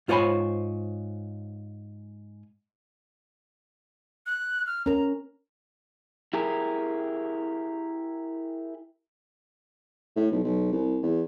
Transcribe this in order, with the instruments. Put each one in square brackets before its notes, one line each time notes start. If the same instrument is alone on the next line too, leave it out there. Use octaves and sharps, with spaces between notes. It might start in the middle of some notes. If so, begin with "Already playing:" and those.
[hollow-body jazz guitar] G#2 F4 C5 C#5 G#5 B5
[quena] F#6
F6
[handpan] C#4 A#4 [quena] A#5
[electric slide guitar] E4 G4 G#4 A#4
[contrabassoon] A2
B1
B1
C2
E2